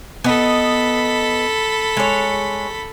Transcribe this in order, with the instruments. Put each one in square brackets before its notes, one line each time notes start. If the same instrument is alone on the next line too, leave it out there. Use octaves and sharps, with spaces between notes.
[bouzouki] B3 D#5 [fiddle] A4 B5
[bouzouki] G#3 C#5